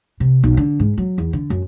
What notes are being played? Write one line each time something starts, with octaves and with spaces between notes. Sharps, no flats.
C3
B1
D3
G#2
F#3
E2
D3
F#2